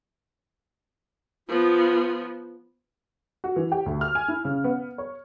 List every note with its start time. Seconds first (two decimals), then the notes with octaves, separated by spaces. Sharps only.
1.48 F3 B3 F4
3.44 F#4
3.56 E3
3.72 G4
3.86 D2
4.01 F6
4.15 G#5
4.28 E4
4.45 C#3
4.64 B3
4.98 C#5